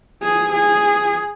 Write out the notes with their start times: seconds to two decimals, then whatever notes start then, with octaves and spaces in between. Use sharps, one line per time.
0.23 G#4
0.53 G#4